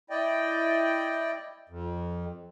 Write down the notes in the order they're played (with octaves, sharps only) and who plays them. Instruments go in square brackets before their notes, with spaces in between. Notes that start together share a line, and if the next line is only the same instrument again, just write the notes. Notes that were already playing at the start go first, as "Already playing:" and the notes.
[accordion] E4 D5 D#5 G5
F2